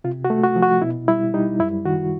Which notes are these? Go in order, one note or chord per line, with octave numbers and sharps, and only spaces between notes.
C3 F4
F#4
A3
F#4
F3
F#4
B2 E4
G3 E4
G3 D#4
F#2 E4
D#3 F#4